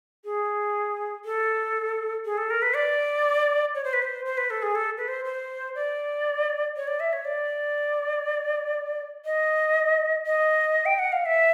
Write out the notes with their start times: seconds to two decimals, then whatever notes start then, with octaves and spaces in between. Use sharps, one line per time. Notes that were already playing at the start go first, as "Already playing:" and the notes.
0.25 G#4
1.25 A4
2.25 G#4
2.37 A4
2.50 A#4
2.62 B4
2.75 D5
3.75 C#5
3.84 C5
3.93 B4
4.02 C5
4.25 C5
4.37 B4
4.50 A4
4.62 G#4
4.75 A4
4.97 B4
5.08 C5
5.25 C5
5.75 D5
6.76 C#5
6.87 D5
7.00 E5
7.13 C#5
7.25 D5
9.25 D#5
10.26 D#5
10.85 G5
10.99 F#5
11.12 F5
11.26 E5